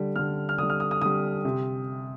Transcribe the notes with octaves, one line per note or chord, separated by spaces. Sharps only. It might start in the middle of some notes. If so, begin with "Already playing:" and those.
Already playing: D3 G3
D3 G3 F6
F6
D3 G3 D#6
F6
D#6
D#6
D3 G3 D#6
C3